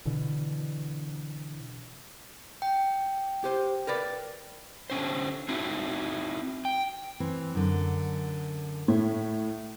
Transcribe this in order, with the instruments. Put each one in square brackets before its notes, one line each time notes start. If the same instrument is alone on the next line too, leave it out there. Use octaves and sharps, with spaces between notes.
[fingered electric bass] B2 D3 E3
[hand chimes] G5
[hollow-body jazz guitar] G4 C5
A#4 B4 D5
[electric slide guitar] D3 C#4 C5
C4 D#4 E4 F#4
G5
[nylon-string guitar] E3 C4
F#2 D3
[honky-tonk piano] A2 [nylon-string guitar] E5